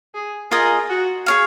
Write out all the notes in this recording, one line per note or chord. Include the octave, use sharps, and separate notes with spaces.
G#4
F4 G#4 A#4 D#5 G#5
F#4
G#4 C#5 F5